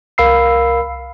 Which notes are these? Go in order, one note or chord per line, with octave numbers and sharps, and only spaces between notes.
C2 A#4 F5 B5 E6 C7